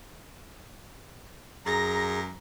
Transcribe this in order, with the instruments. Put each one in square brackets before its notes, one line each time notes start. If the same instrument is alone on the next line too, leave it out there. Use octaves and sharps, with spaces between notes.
[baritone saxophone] F#2 [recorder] G#4 [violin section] A#5 A#6